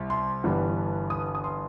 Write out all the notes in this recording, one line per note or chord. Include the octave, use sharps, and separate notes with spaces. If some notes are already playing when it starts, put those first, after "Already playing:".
Already playing: C2
C6
G1 G2 E3 G3 B3
D#6
D#6
C6